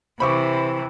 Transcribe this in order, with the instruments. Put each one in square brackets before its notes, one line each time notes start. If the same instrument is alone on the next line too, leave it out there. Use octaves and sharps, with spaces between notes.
[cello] C3 E3 [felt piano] C5 C#6 D6 [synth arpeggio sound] B5